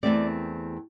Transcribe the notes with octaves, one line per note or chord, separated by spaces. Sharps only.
E2 B2 A3 C4 D5